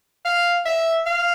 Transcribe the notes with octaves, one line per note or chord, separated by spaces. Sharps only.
F5
E5
F5